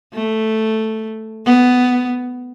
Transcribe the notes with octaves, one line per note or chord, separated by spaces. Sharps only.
A3
B3